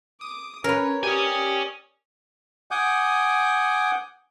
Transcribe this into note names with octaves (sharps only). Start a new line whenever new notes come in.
D6 D#6
C#4 A#4 B4 C#5
G4 C#5 D5 G#5 D#6
F#5 G#5 D6 D#6 G6